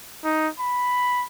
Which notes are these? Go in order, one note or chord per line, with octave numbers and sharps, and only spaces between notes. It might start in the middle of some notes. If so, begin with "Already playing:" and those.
D#4
B5